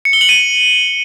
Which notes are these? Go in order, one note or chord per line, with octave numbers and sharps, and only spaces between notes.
C#7
G7
F#7
D#7